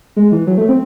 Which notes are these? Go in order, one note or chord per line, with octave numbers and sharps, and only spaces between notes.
G#3
E3
F#3
A3
C4